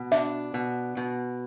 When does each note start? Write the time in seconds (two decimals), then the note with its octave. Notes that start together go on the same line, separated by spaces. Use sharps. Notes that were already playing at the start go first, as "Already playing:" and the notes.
Already playing: B2
0.11 D4 E5
0.54 B2
0.97 B2